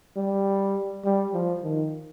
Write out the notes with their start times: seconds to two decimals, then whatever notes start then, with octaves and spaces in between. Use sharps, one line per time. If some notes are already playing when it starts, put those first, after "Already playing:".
0.16 G3
1.05 G3
1.33 F3
1.63 D#3